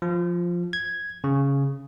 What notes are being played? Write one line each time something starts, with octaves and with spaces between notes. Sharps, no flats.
F3
G#6
C#3